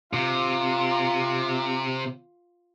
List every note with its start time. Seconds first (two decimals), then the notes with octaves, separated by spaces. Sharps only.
0.13 C3 F4